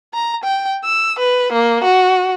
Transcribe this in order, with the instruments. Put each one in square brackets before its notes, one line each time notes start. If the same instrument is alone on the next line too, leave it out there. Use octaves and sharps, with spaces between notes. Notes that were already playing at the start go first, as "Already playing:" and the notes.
[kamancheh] A#5
G5
E6
B4
A#3
F#4